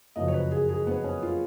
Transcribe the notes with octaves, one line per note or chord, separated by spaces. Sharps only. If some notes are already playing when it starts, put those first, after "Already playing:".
F#1 F2 C#3 F#3 D#5
C#5
B4
G#4
G#4
B3
C#4
F4